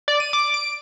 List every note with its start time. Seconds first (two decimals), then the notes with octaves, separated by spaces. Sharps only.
0.08 D5
0.20 D#7
0.33 D6
0.54 D7